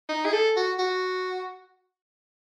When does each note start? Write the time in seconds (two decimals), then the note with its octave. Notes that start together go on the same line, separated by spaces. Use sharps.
0.09 D#4
0.25 G#4
0.33 A4
0.56 F#4
0.79 F#4